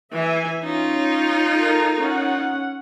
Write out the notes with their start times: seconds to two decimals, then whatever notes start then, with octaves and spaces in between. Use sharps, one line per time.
0.13 E3 E5 G#5
0.63 C#4 D#4 F4
1.59 A4 A#4 A#5
2.01 C#4 F#5